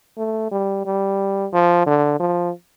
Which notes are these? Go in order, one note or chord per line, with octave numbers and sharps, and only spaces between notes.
A3
G3
G3
F3
D3
F3